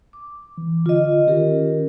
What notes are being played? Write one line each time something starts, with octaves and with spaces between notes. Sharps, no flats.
D6
E3
D3 F4 D#5
D#3 C#4 G4 A#4